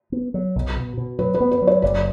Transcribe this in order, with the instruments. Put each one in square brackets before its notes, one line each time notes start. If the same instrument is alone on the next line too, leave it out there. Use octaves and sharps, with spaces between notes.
[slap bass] B3
F#3
B1
B2
B2
[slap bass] F#3 [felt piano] B4
[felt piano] B4
[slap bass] B3
[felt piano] B4
[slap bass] F#3
[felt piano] C#5
[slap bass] F#1 [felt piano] D5